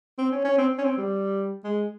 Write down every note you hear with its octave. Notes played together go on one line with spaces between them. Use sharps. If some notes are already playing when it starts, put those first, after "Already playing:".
C4
C#4
C#4
C4
C#4
C4
G3
G#3